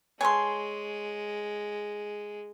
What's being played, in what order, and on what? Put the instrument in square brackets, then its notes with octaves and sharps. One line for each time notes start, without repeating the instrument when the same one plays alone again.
[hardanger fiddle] G#3 [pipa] A4 B4 G#5 [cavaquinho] C#5 C6